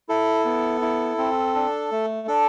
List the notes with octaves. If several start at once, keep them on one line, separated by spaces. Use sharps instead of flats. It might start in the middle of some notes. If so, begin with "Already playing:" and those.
E4 A4
B3
E4
C4
D4
A3
D4 A4